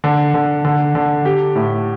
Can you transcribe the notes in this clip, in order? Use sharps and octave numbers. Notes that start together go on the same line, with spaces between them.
D3
D3
D3
D3
G4
A2